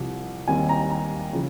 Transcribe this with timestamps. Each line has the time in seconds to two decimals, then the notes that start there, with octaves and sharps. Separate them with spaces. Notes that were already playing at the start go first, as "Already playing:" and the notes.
Already playing: C2 C3 F3
0.48 D#2 D#3 G3 C4 G#5
0.69 A#5
0.90 A#5
1.33 C#3 F3